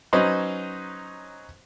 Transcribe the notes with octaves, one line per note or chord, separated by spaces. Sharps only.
F#3 C#4 D#4 B4 C5